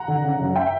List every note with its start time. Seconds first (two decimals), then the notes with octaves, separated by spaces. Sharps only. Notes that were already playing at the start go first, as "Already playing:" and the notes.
Already playing: F#5 A#5
0.08 D3
0.24 C#3
0.40 F#2
0.56 E5 G5